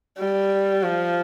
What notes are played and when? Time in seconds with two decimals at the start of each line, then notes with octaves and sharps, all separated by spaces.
0.19 G3
0.83 F3